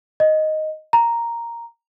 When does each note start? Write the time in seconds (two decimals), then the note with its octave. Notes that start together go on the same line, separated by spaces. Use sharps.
0.20 D#5
0.93 A#5